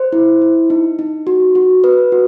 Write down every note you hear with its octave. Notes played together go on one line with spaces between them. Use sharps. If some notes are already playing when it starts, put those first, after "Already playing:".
Already playing: C5
E4
E4
D#4
D#4
F#4
F#4
B4
F#4